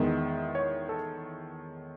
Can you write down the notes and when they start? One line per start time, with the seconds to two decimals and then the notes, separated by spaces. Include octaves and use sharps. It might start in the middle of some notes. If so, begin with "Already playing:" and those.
Already playing: E2 D#3 G#3 B3 E5
0.55 C#5
0.89 A4